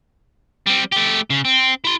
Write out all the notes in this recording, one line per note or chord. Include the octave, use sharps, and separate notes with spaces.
G3 C4
A3 G4
C#3
C4
E4 C6